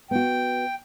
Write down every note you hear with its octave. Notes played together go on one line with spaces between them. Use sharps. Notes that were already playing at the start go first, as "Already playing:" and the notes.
B3 F#4 G5